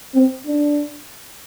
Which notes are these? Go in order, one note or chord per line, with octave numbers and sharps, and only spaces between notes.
C4
D4